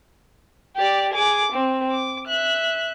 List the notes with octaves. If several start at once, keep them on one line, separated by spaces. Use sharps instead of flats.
G4 D5
G#4 D6
C4
D6
E5 F#6